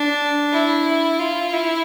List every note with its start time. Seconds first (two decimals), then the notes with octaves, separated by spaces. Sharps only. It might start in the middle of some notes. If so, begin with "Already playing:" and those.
Already playing: D4
0.52 E4
1.20 F4
1.53 E4